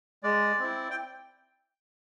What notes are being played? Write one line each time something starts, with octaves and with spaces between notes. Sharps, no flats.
G#3 D5
C4 E4
G5